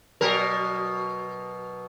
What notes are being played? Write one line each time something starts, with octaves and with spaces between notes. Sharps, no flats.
B2 F#3 A#4